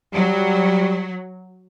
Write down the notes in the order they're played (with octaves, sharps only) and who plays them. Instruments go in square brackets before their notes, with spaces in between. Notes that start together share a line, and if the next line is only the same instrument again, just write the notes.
[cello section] F#3 [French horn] G3